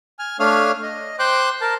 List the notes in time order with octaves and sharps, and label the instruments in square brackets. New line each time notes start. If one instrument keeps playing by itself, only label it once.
[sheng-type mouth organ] G#5 F6
A3 D4 C#5 F5 D#6 F6
D#5
C5 G5 C6 D6 F#6
A#4 A5